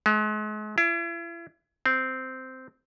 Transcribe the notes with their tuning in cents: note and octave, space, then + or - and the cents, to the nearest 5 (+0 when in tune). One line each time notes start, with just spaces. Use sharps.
G#3 +40
E4 +40
C4 -10